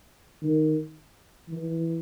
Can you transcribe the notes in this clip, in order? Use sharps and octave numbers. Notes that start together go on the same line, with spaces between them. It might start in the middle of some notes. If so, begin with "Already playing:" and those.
D#3
E3